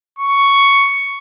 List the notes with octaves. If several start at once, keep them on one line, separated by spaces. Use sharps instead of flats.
C#6